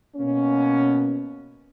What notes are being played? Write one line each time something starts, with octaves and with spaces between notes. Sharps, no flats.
B2 A#3 C#4